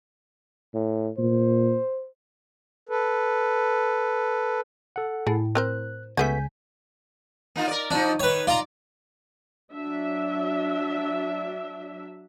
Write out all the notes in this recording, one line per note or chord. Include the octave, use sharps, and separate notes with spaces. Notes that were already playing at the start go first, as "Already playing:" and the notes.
A2
A#2 C5
A4 B4
A4 F#5
A2 G#4
C4 A#4 C5 F#6
C#2 C#3 A3 B3 F#4 G#5 G6 B6
A#3 D#4 F4
A#4 D5
F3 D4 D#4
D#3 B4 C#5
F4 D5 A#5
F#3 D4 E5